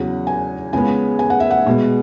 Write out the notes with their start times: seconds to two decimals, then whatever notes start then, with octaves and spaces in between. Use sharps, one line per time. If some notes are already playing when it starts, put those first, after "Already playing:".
Already playing: E2 C#3 F#3 F#5
0.27 G#5
0.73 C#2 C#3 G#3 B3 G#5
1.19 G#5
1.30 F#5
1.40 E5
1.51 F#5
1.66 B2 G#3 B3